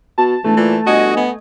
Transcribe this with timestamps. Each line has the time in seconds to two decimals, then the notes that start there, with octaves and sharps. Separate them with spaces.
0.18 B2 A5
0.44 E1 E3 A3
0.57 A#2 E3
0.86 G1 F#4 D#5 G#5
1.17 B3